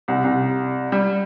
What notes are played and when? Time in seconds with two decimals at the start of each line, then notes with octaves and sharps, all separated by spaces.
0.08 C2
0.24 C2
0.92 G3